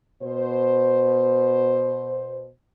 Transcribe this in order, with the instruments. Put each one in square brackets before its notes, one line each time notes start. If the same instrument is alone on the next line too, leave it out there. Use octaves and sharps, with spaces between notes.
[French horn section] B2 C5